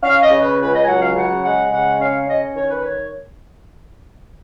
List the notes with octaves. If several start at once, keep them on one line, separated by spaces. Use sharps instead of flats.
C#4 F5
D#5
C#3
B4
C#2 B4
D#5
G#5
F#3 F#5
F5
C#3 F#5
G#3 F#5
C#3 F#5
C#4 F5
C#4 D#5
D#3 C#5
B4
C#5